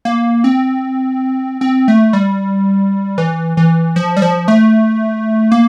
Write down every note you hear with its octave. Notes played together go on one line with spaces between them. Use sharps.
A#3
C4
C4
A3
G3
E3
E3
F3
G3
F3
A3
A#3